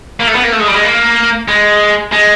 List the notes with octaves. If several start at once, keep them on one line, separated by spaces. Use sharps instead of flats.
A#3
A3
B3
A#3
A3
G#3
G3
G#3
A#3
G#3
G#3